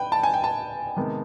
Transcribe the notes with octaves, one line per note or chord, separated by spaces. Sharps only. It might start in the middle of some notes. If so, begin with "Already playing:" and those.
Already playing: B4 G5
A5
G#5
G5
A5
C3 D#3 G#3 B3